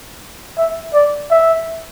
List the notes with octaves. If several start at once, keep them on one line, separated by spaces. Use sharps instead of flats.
E5
D5
E5